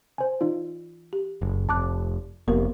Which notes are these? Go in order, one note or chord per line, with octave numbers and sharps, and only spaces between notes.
C5 G#5
E3 D#4 F4
G4
F#1
F1 A5 D6 F#6
F1 A#3 B3 G4 A#4